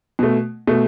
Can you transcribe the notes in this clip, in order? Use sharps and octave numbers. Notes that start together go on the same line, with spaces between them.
B2 A3
B2 A3